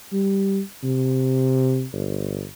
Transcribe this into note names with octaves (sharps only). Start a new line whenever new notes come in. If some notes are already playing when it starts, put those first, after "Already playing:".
G3
C3
G1